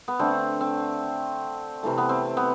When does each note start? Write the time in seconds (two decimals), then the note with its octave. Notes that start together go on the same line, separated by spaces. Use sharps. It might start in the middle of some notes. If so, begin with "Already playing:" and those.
0.08 B3
0.19 D3 A3 C4
0.61 C4
1.83 C3 E3 A3
1.98 B3
2.09 C4
2.37 B3